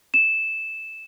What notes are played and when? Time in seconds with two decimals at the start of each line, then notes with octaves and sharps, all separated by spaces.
0.14 E7